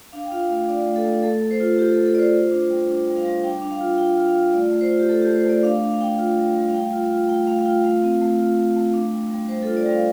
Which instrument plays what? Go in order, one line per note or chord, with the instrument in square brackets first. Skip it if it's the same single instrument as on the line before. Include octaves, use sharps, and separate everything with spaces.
[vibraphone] D4 F5
G5
F4 F5
A3 F5
D4 D5
A3
A4
A3
A3 A4
A3
C5
F4
F4 G4
A4
A3
A4
F4 C5 D5
F4
D4
G3
D4
G3
F5
G3
D4 G5
D4
F5
F4
F4 G5
F4
F5
F4
A3 D5
A3
C5
F4
G4
A3 A4
A3 G4
C5
A3 D5
D4 F5
D4
F5
D4 G5
F5
F4
G3
G3
F5
A3 G5
F4
F4
A3 G5
A3 F5
F5
F4 G5
A3 F5
C4
A3
F4
A3
A3
D4
G3
G3
G3 C5
F4 A4
D5
G3 F5